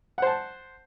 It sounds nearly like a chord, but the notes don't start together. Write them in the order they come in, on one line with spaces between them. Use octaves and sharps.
F#5 C5 A5